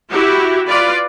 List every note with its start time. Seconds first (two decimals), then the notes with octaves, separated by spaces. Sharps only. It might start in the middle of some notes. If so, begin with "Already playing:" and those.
0.12 E4 F#4 G4
0.69 F4 B4 D5